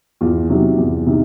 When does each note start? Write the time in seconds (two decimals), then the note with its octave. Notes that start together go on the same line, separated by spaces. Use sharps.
0.21 E2 F4
0.49 C3 D#3 F#3
0.78 E2
1.06 C3 D#3